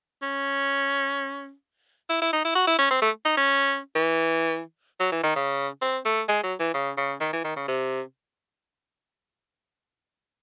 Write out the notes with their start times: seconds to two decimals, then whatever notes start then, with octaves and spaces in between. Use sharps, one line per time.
0.22 C#4
2.09 E4
2.21 E4
2.33 D#4
2.44 E4
2.55 F#4
2.67 E4
2.78 C#4
2.91 C4
3.02 A3
3.25 D#4
3.37 C#4
3.95 E3
5.00 F#3
5.11 E3
5.23 D#3
5.35 C#3
5.81 C4
6.05 A3
6.28 G#3
6.43 F#3
6.59 E3
6.74 C#3
6.97 C#3
7.20 D#3
7.33 E3
7.44 D#3
7.56 C#3
7.68 C3